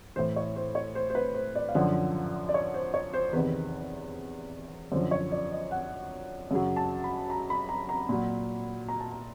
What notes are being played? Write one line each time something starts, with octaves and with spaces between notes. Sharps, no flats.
A2 E3 C5
C#5
C5
C#5
C5
C5
B4
C5
D5
F5
F#2 D3 F3 F#5
D5
C#5
C5
C#5
C5
E2 C3 D#3 B4
F#2 D3 F3 C5
C#5
D5
D#5
F#5
F#2 C#3 F#3
A5
B5
A#5
B5
A#5
A#5
A#2 F#3 B5
A#5
A5
A#5